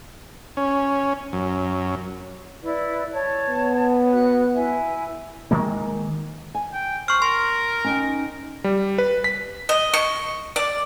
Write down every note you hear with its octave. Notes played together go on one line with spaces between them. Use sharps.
C#4
F#2
E4 B4 D5
C#5 A5
B3
F#4 F#5 F#6
E4 E5 G#5
D#3 G#3 A#3
G#5
G5
C5 C#6 F6
A#4 C6
C#4 D#4 G5
G3
B4
B6
D#5
C#6
D5